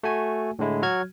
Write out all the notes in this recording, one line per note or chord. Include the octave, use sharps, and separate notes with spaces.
A3 F#4 G#5
A2 D3 G#3 E4
F#3 F#4 F6 G#6